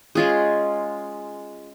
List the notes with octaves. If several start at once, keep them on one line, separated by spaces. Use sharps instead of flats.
G#3 C#4 F4 G#4